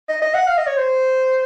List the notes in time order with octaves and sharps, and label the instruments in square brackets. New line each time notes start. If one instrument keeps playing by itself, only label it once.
[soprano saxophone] D#5
D#5
F#5
F5
D#5
C#5
C5